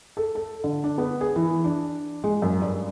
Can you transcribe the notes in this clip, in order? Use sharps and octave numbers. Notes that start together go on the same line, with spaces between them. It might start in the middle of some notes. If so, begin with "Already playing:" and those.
A4
A4
D3
D4
B3
G#4
E3
D4
G#3
F#2
G2